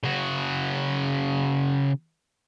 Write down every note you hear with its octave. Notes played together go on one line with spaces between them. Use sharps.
C#3 F#4